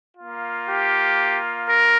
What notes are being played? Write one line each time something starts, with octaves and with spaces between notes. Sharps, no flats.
A#3 F4
G4
A#4